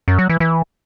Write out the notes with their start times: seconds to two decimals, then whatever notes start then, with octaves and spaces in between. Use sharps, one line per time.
0.08 F#2
0.19 F#3
0.29 E3
0.40 E3